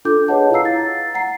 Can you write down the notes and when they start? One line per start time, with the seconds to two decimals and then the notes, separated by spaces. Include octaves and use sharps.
0.05 D4 F4 A4 D6 G6
0.28 G#4 B4 C#5 D#5 F#5 A5
0.51 E4 F4 F5 A#5 E6 C7
0.65 A6
1.14 F#5 A#5 C7